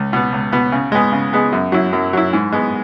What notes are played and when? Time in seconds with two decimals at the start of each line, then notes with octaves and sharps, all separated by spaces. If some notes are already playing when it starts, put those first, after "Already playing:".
Already playing: C#2
0.13 B2 B3
0.32 C#2
0.52 B2 B3
0.72 C#3
0.92 G#3 B3 G#4
1.12 C#3
1.33 G#3 B3 G#4
1.52 F#2
1.72 F#3 E4
1.93 F#2
2.13 F#3 E4
2.33 G#2
2.52 G#3 B3